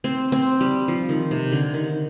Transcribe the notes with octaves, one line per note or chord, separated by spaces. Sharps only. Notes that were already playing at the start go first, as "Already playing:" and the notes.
C4
C4
G3
F3
D#3
C3
D3
D#3